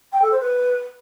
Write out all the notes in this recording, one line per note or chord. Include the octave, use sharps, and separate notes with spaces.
G5
A4
C5
B4